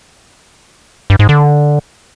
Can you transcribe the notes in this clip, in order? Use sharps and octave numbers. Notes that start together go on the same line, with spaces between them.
G2
G#2
D3